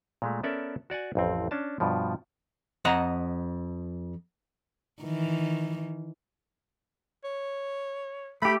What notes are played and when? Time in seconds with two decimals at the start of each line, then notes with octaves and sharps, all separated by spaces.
0.22 A#2 G#3 A3
0.43 B3 C#4 A4 A#4 D5 E5
0.90 F#4 D5 F#5 G#5
1.15 A1 F2 C4
1.51 C#4 D4 A5
1.80 G2 B2 F3
2.85 F2 D#5 F#5 A#5
5.03 D#3 E3
7.24 C#5
8.42 A3 G4 B5